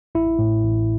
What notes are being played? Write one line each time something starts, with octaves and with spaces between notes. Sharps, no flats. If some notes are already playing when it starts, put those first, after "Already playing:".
A1 E4
A2
A1